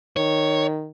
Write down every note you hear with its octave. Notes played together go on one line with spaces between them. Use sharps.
D#3 C#5